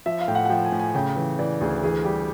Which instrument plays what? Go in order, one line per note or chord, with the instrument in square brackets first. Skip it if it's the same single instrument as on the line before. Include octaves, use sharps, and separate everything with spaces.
[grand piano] F3 [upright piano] E5
[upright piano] F5
[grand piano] A2 [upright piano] G5
[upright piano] F#5
F#5
[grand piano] F3 [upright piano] G5
[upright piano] G#5
[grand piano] A2
[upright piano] G#5
[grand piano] C#3 [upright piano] G5
[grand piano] E3
[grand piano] E3 [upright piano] D5
[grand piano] D2 [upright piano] G#4
[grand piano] E3 [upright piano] G#4
[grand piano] G3 [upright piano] G4